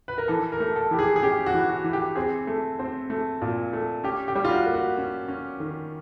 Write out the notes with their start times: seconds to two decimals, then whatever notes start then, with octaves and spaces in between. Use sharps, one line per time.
0.08 B4
0.18 A#4
0.28 E3 A4
0.52 A#4
0.60 A3
0.76 A4
0.91 E3 G4
0.99 G#4
1.16 G#4
1.23 C#4 G4
1.46 F#4
1.54 E3
1.69 F#4
1.84 E3
1.93 G4
2.16 C4 G#4
2.47 A3
2.79 C4
3.10 A3
3.42 A#2
3.73 A3
4.04 C#4 G4
4.28 G4
4.35 G3
4.45 F4
4.51 F#4
4.66 A#3
4.74 F#4
4.98 C#4
5.28 C#4
5.60 D#3